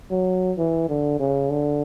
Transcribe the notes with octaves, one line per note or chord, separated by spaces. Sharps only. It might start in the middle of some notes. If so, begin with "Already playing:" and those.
F#3
E3
D3
C#3
D3